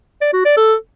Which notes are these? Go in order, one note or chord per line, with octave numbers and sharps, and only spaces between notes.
D5
F#4
D5
A4